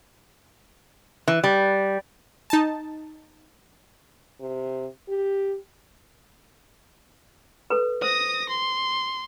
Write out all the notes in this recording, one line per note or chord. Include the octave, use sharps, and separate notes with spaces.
E3
G3
D#4 A5
C3
G4
A4 B4
C5 D#6 A#6
C6